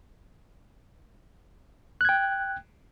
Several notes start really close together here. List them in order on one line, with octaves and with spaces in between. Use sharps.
F#6 G#6 G5